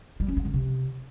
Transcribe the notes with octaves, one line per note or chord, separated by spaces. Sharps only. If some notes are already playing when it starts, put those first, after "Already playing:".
G3
C#4
G#3
D3
C3